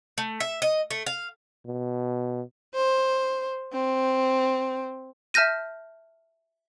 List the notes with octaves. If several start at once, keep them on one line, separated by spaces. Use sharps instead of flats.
A3
E5
D#5
A3
F5
B2
C5
C4
E5 A5 F6 G6 A#6 D#7